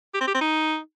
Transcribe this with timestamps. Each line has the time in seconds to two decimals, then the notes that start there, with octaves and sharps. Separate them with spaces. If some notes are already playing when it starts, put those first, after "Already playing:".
0.14 G4
0.21 C4
0.27 G4
0.34 C4
0.41 D#4